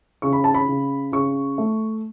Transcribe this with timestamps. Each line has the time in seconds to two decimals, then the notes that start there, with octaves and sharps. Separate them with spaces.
0.22 C#3 C#6
0.33 B5
0.44 A5
0.54 B5
0.68 C#3
1.12 C#3 C#6
1.58 A3